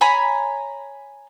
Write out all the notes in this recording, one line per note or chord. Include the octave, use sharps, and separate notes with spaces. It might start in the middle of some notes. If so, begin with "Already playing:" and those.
C#5 G#5 A#5 B5